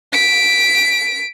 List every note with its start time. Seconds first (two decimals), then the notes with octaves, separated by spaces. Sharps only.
0.13 B6 D7